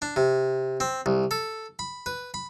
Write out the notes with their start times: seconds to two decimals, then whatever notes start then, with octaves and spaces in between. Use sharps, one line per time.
0.02 D4
0.16 C3
0.80 C4
1.06 C2
1.31 A4
1.79 B5
2.06 B4
2.34 B5